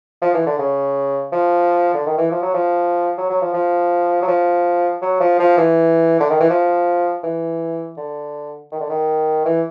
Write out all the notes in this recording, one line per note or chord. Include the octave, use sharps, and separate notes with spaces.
F3
E3
D3
C#3
F3
D3
D#3
E3
F3
F#3
F3
F#3
F#3
F3
F3
F#3
F3
F#3
F3
F3
E3
D3
D#3
E3
F3
E3
D3
D#3
D3
D#3
E3